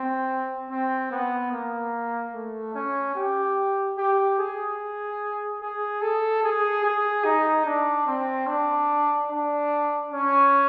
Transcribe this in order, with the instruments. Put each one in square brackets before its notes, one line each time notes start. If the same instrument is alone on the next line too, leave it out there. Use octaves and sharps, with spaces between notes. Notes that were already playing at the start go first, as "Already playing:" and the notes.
Already playing: [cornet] C4
C4
B3
A#3
A3
C#4
G4
G4
G#4
G#4
A4
G#4
G#4
D#4
D4
C4
D4
D4
C#4